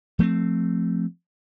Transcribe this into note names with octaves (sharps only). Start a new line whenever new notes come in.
F3 A3 A#3 C4